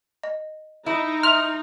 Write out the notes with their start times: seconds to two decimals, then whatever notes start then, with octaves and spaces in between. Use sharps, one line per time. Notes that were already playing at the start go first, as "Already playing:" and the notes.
0.24 D#5
0.86 D#4 E4
1.23 E5 C6 F6